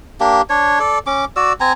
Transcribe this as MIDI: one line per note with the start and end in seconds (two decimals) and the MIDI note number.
0.20 0.42 58
0.20 0.42 62
0.20 0.42 67
0.50 0.79 62
0.50 0.79 73
0.80 0.99 69
0.80 0.99 74
1.07 1.25 61
1.07 1.25 86
1.36 1.53 66
1.36 1.53 74
1.36 1.53 88
1.60 1.73 60
1.60 1.73 80
1.60 1.73 82